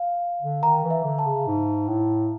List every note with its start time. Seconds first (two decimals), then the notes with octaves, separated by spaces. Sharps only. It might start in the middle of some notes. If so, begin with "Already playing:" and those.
Already playing: F5
0.42 D3
0.63 D#3 A#5
0.84 E3
0.91 E5
1.04 D3
1.19 A5
1.26 C#3
1.47 G#2
1.88 A2